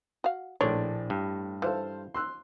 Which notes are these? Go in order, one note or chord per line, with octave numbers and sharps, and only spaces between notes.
F#4 F5
A#1 A2 A3 D4 C#5 C6
G2
E3 A4 C5 F5
C6 E6 F#6